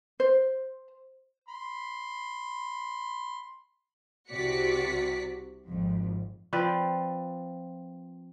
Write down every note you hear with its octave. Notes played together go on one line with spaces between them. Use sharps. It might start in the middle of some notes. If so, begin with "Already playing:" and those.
C5
B5 C6
C2 C3 F#4 D5 B6 C#7
G#1 F2
F3 C4 B4 D5